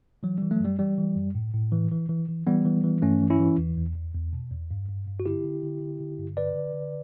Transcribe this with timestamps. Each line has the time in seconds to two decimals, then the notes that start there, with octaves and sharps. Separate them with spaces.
0.23 E3 F#3
0.38 E3 G3
0.51 F#3 A3
0.60 F#2 G3
0.79 E3 G3
0.98 E3
1.16 F#2
1.35 A2
1.54 A2
1.72 E3
1.91 E3
2.09 E3
2.28 E3
2.47 E3 G3 B3
2.65 E3
2.84 E3
3.02 G2 A3 C#4
3.21 E3
3.30 C#4 E4
3.40 E3
3.58 E2
3.77 E2
3.95 E2
4.14 E2
4.33 B2
4.51 E2
4.70 G2
4.88 G2
5.07 G2
5.20 F#4
5.26 D3 E4 G4
5.44 D3
5.63 D3
5.81 D3
6.00 D3
6.18 G2
6.37 D3 B4 D5
6.56 D3
6.74 D3